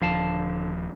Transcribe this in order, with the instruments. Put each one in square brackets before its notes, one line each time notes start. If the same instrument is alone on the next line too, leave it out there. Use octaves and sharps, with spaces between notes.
[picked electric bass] D#1 F3 [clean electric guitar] D3 F5 A5